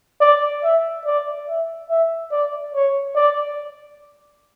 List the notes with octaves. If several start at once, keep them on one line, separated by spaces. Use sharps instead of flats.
D5
E5
D5
E5
E5
D5
C#5
D5